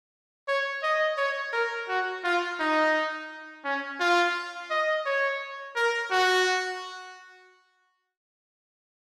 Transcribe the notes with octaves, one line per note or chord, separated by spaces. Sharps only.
C#5
D#5
C#5
A#4
F#4
F4
D#4
C#4
F4
D#5
C#5
A#4
F#4